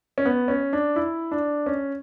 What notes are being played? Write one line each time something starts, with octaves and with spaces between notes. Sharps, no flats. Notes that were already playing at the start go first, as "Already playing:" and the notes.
C#4
B3
C#4
D4
E4
D4
C#4